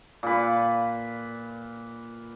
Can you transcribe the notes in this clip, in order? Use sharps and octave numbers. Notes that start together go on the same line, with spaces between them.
A#2 B4